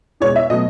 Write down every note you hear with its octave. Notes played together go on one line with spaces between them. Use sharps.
E2 B2 G#3 C#5
E5
B2 F#3 A3 D#5